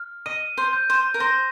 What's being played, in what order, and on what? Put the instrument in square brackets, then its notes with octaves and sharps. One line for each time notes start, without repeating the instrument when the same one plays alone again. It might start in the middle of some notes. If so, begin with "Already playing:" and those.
Already playing: [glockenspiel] F6
[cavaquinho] D#5 [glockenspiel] D#7
[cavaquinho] C5
[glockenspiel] G6
[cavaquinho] C5
A#4
[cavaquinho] C5 [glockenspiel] A#6